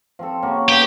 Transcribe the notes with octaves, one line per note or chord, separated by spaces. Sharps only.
F3 C4 A4
C#3 A#3 F#4
G2 B3 F#4 G4